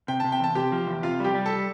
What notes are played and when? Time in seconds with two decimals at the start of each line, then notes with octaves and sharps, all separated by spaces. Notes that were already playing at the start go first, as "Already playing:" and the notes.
0.08 C3 G5
0.20 C3 A5
0.32 G5
0.40 E2 A5
0.55 C3 G4 G5
0.72 F3
0.87 E2
1.03 C3 F4 F5
1.20 G3 G4 G5
1.35 G3
1.46 A4 A5